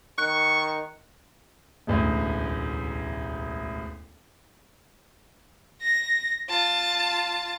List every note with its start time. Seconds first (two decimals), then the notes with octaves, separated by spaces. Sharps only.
0.18 D#3 C#6 F#6 C#7
1.87 E1 A1 D2
5.82 A#6
6.49 F4 A5